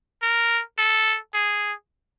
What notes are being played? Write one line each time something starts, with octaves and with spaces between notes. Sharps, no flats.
A#4
A4
G#4